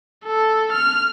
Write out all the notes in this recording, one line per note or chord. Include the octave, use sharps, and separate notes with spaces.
A4
F6